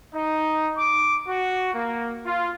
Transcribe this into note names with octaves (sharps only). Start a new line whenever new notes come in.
D#4
D6
F#4
A#3
F4